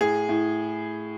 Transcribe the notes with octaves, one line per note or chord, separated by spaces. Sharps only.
A2 G#4
A2